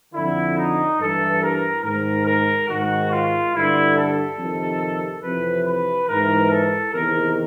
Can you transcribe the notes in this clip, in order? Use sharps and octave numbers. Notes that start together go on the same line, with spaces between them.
F2 D3 E4
D#4
G2 E3 A4
A#4
G#2 D#3 A#4
A#4
G#2 D#3 F#4
F4
G2 D3 E4
A4
F2 C3 D#3
F2 C3 E3 B4
B4
G#2 E3 A#4
A4
E2 C3 D#3 A#4